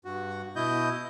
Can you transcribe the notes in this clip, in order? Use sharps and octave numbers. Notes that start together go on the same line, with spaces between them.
G2 F#4
B2 E4 D#5 G6